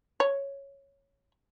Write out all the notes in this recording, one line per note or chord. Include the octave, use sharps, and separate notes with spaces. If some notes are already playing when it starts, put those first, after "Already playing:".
C#5